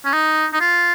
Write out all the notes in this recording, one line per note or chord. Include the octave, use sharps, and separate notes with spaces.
C#4
D#4
D#4
F4